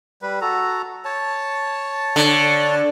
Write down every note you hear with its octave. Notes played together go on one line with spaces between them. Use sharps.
G3 B4
F#4 A4 A#5
C#5 A5
D3